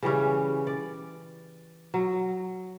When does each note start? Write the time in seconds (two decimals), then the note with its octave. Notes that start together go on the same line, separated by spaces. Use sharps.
0.02 C#3 E3 G3 C#4
0.67 D5
1.94 F#3